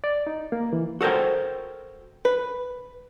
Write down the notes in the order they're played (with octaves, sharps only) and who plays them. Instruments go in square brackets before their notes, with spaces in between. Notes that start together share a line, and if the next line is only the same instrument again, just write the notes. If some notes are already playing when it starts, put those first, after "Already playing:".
[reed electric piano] D5
D#4
A#3
E3
[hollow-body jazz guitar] F#4 A4 A#4 C5 G5
[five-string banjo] B4